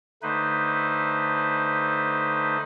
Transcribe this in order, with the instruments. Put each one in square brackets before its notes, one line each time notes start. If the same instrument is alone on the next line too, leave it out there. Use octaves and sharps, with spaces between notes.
[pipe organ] D3 A3 D#4 B4 C5